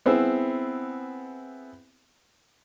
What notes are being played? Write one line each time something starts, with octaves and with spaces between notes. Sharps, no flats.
B3 C4 E4 G#4